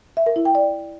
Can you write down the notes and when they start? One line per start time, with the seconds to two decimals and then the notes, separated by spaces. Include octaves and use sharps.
0.17 E5
0.26 A#4
0.36 E4
0.45 G5
0.55 D5